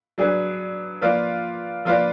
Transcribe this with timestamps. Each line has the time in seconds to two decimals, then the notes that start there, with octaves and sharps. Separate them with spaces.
0.18 F#3 D4 G#4 B4
1.01 F3 A#3 F4 B4 D5
1.85 F3 A#3 F4 B4 D5